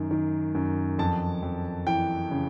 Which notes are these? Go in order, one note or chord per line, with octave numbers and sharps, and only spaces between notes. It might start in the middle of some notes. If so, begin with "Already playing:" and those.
Already playing: F#2 D#3
D#3
F#2
F2 A5
F2
E3 G5
C#3